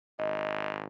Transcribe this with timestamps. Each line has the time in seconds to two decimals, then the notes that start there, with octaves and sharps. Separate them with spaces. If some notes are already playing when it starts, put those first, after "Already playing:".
0.19 G#1 D#5